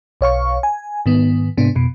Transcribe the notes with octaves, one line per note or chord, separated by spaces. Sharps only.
B1 C#5 F5 C#6
G#5
G#2 D#3 B3
G#2 C3 B3 D4
F2 B2